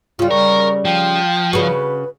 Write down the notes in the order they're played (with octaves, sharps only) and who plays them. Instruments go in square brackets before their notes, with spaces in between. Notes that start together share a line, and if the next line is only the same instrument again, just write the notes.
[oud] C#3 G3 [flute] F4
[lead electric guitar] A#4 [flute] C#6
[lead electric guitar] F3 [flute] G5
[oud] C#3 F#4 [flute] B4